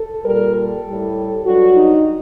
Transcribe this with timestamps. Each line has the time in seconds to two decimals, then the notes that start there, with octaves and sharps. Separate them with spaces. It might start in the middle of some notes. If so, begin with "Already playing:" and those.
Already playing: A4
0.25 A#2 G3 A#4
0.55 A4
0.85 A2 G3
1.45 G2 F#3 F#4
1.75 D#4